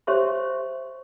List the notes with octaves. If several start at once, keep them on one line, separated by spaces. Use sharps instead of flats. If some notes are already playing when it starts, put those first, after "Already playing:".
G4 C5 C#5 E5 C6 C#6